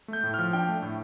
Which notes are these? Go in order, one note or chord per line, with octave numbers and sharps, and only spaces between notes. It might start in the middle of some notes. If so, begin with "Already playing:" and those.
A3 G6
A2
F6
F3
D4 G5
A3
A2